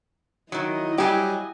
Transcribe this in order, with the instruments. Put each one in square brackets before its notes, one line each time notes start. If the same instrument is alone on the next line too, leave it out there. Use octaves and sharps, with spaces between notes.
[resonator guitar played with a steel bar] D#3 F#3 [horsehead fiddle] E4 D#5
[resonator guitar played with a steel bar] F#3 G4 [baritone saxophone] G3 [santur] G#5